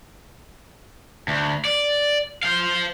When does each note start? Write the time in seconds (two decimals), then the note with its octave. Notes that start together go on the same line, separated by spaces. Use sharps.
1.28 D2
1.65 D5
2.43 C5 F5